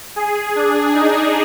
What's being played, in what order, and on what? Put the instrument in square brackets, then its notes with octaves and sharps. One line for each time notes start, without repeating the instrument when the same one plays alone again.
[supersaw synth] G#4
D4
D#4